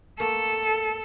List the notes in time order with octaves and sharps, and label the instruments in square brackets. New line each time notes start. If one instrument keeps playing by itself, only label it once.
[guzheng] A3 A#3 [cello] A4